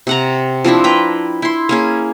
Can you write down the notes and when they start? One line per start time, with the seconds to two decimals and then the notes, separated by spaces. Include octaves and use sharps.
0.07 C3 F#5 A#5
0.64 F3 C4 D4 E4
0.84 B4 G5 A#5
1.42 E4 C6
1.69 A#3 C#4 G#4